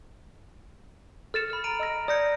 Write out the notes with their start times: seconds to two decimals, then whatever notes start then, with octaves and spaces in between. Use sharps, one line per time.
1.34 A4 F6 A6 C#7 E7
1.50 B5 F6
1.64 A#5 D7 D#7
1.80 D#5 E6 A#6
2.08 D5 D#6 G6 G#6 A#6 C#7